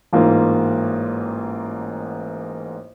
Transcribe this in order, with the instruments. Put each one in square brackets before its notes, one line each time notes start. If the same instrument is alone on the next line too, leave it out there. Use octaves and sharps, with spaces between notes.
[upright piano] A1 G#2 A#3 F4